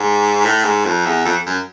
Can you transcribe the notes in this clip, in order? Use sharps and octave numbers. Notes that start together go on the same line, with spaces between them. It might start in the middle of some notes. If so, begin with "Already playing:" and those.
Already playing: G#2
A2
G#2
F2
E2
F2
F#2